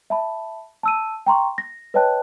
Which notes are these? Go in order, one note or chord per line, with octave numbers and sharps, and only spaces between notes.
E5 A5 B5
A5 E6 D#7
G5 A#5 C6 C#6
A#6
B4 C#5 D#5 G5 A5 F#6